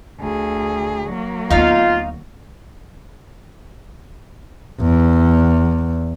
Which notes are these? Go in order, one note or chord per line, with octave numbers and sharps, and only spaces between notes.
D2 G#4
F#3 A#3
D2 B3 D#4 F4 F5
E2